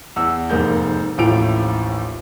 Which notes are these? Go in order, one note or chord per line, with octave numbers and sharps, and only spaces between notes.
E2 E6
F1 G#2 A#3 G6
A1 D#2 A2 F3 D7 F7